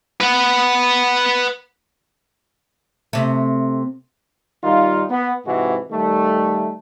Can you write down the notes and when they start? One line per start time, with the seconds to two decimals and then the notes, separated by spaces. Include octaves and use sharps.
0.21 B4 F#5
3.13 C3 A3
4.63 D#3 G3 D#4 F4
5.10 B3
5.45 G#2 C3 E3 G#3 F#4
5.91 D#3 G3 A3